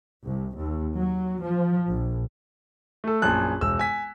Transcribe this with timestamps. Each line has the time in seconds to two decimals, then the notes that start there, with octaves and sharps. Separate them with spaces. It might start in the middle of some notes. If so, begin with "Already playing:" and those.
0.24 C2
0.58 D#2
0.98 F#3
1.42 F3
1.90 A#1
3.04 A3 A4
3.22 A#1 F#2 A5 F#6
3.61 E1 E6
3.79 G#5 B6